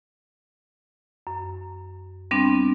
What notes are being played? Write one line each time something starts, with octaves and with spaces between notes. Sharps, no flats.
F#2
G3 B3 C4 D4